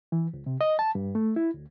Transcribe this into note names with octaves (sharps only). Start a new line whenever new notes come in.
E3
C#2
C3
D#5
A5
G2
A3
E4
D2